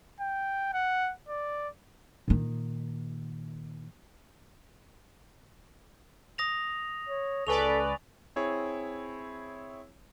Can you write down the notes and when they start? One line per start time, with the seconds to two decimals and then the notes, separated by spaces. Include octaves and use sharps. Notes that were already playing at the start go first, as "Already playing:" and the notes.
0.20 G5
0.73 F#5
1.29 D5
2.28 A#2 D#3
6.38 D#6 A#6 F7
7.09 C#5
7.47 C#2 A4 B4 D5 G#5 C#6 F7
8.36 C4 E4 G#4 C#5